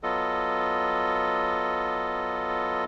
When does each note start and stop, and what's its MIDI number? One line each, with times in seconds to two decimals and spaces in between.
0.03 2.85 54
0.03 2.85 59
0.03 2.85 65
0.03 2.85 69
0.03 2.85 75